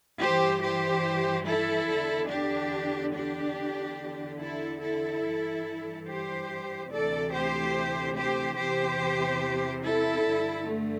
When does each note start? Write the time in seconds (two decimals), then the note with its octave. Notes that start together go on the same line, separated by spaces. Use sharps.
0.20 G2 E3 G4 C5
0.62 G4 C5
1.46 E4 A4
1.88 E2 D3
2.29 D4 G4
3.14 D4 G4
3.56 E2 D3
4.40 E4 A4
4.82 E4 A4
5.24 G2 E3
6.07 G4 C5
6.91 D2 C3 E3 A4 D5
7.34 G4 C5
8.16 G4 C5
8.59 E2 C3 E3 G4 C5
9.84 E4 A4
10.27 G2 D3
10.68 A3